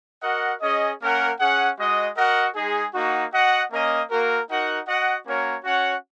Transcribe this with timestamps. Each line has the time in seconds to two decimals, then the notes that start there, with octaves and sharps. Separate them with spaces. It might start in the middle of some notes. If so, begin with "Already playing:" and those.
0.23 F#4 A#4 D#5 F#5
0.61 C#4 G#4 D#5
1.00 A#3 C#4 A#4 F#5
1.38 C#4 G#4 F#5
1.77 G#3 F#4 D#5
2.16 F#4 A#4 D#5 F#5
2.55 G#3 D#4 G#4
2.93 A#3 D#4 F#4
3.32 F#4 D#5 F#5
3.71 A#3 C#4 A#4 D#5
4.09 A#3 F#4 A#4
4.48 D#4 F#4 A#4 F#5
4.87 F#4 D#5 F#5
5.25 A#3 C#4 F#4 A#4 C#5
5.64 C#4 F#4 C#5 F#5